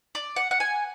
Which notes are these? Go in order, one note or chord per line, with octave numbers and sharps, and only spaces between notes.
D5
F#5
F#5
G#5